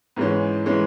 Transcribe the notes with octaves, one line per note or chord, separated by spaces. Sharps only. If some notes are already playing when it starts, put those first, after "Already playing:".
G#2 E3 G#3 C#4
E3 G#3 C#4